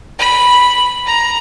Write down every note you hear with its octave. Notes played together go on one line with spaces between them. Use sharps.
B5
A#5